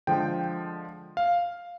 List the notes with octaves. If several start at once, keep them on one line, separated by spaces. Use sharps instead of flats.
D3 F3 G#3 G5
F5